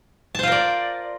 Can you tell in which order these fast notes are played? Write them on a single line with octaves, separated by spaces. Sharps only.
A5 C5 F4 A#4 D5